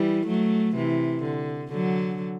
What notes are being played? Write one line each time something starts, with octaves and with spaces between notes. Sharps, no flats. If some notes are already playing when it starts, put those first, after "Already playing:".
Already playing: E3 G3
F#3 A3
C3 E3
D3
D3 F#3